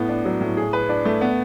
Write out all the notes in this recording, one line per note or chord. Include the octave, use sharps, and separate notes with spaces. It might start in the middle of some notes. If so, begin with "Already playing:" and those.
Already playing: A2 B3
D4
F#3
A2
G#4
B4
D4
A3
B3